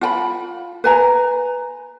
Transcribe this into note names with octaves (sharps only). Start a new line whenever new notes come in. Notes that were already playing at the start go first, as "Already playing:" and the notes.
F4 G5 B5
B4 G#5 A#5